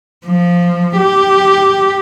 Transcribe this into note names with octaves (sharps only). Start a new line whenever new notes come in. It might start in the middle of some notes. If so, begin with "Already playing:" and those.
F3
G4